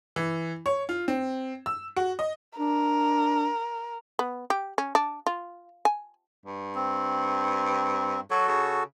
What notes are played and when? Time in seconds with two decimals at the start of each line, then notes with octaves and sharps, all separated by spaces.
0.16 E3
0.66 C#5
0.89 F4
1.08 C4
1.66 E6
1.96 F#4
2.19 D#5
2.59 D4 A#4
4.19 B3
4.50 G4
4.78 C#4
4.95 D4
5.27 F4
5.85 G#5
6.46 G2
6.75 C4
8.31 F#3 F#4 A4
8.48 C#3